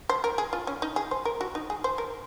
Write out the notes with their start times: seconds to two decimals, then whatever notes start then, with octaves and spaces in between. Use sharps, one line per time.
0.09 C5
0.24 A#4
0.38 G#4
0.53 F4
0.67 C#4
0.82 D#4
0.96 G#4
1.11 C5
1.25 A#4
1.41 F#4
1.55 D#4
1.70 G#4
1.84 C5
1.98 A#4